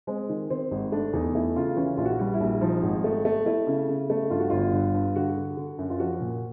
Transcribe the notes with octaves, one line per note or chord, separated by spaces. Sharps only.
G#3 C4
D#3
D#3 C4
G#1
A3 D4
E2 D#4
A3 E4
C#3 F4
E3 C#4
A#1 F4
F#4
G3
E4
A#1
F3 D#4
G#1
A3
A3
A3 E4
C#3
C#3
A3
G2 F4
F#4
G1 F4
G2
G2
D3 F#4
D3
D3
F#2
F4
F3 F#4
A#2